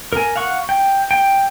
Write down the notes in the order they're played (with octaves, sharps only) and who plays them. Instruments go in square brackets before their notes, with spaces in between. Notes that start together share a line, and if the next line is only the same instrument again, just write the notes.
[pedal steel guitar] A#4 G#5
F5 F#5 C#6
G5
G5